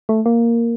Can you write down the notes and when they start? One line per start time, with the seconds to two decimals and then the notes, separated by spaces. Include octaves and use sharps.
0.09 A3
0.26 A#3